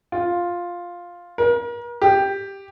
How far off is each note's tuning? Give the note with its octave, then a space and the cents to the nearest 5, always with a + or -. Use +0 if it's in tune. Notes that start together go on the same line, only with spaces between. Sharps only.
F4 +5
A#4 +35
G4 +5